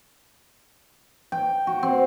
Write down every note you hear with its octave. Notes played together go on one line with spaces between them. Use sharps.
G5
F#4
C4